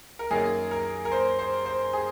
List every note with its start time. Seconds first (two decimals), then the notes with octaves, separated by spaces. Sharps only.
0.19 A#4
0.31 F#2 D#3 A#3 G#4
0.71 A#4
1.05 A#4
1.12 C5
1.39 C5
1.66 C5
1.93 G#4